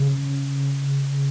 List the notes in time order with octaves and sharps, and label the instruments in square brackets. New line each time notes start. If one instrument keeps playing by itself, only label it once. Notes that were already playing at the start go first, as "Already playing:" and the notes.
Already playing: [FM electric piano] C#3